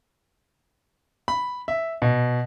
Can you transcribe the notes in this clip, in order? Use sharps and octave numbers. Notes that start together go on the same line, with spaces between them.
B5
E5
B2